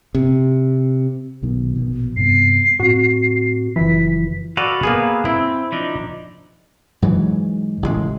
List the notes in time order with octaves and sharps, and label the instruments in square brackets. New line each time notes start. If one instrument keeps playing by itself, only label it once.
[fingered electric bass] C3
B1 B2 D#3
A#1 B2
[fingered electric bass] G2 C3 B3 [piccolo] C7
[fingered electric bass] A2 C4 [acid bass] F#4
[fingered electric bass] F#1 F3 [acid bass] E3 [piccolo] B6
[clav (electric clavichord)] F#4 D5 [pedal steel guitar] A4 B4 F5
[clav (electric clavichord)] A#3 B3 G#4
[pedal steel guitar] C4 [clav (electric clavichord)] E4
[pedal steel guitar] F3 D4 D#4
[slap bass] G#2 E3 F#3
A1 C#3 E3 G#3